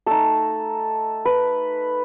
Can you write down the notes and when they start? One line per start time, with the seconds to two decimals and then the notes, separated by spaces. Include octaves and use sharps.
0.07 A3 D#4 A4
1.25 B4